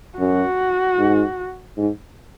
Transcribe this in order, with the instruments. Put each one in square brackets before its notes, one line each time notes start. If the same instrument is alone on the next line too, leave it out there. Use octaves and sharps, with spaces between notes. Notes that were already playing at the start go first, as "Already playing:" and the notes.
[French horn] F#2 [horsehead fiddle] F#4
[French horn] G#2
G#2